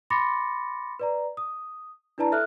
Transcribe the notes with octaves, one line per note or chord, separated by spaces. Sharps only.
B5 C6 D6 A6 A#6 C#7
B4 D5 A#5
D#6
D4 E4 B4 D5 A5 A#5
A4 E5 F6 F#6